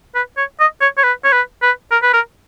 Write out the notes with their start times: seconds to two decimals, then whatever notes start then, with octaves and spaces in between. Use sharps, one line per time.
0.15 B4
0.37 C#5
0.60 D#5
0.81 C#5
0.98 C#5
1.04 B4
1.24 C#5
1.32 B4
1.62 B4
1.91 A#4
2.03 B4
2.13 A#4